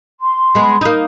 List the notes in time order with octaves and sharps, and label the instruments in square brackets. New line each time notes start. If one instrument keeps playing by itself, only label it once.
[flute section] C6
[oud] G#3 B3
A#3 D#4